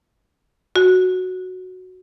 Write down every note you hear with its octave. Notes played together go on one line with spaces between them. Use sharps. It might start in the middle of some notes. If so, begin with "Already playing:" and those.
F#4